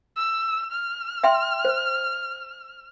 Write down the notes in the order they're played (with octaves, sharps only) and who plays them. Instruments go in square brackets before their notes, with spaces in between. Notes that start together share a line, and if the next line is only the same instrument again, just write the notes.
[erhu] E6
F6
[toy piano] E5 G5 C6
C5